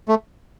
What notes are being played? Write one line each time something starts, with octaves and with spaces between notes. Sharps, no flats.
A3